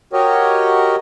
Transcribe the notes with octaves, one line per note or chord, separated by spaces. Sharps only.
F#4 G4 A#4 C#5 D#5